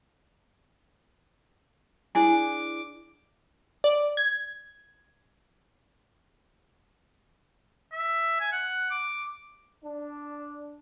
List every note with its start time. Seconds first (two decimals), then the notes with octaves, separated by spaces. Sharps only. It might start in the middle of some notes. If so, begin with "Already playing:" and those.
2.15 D4 E4 G#4 D6
3.84 D5
4.17 G#6
7.92 E5
8.40 G#5
8.52 F#5
8.91 D6
9.85 D4